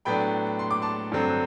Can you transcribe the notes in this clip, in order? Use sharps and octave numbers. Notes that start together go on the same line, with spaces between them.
A2 F#3 B3 D4 G5 B5
C6
D6
A5 C6
G2 D3 F#3 C4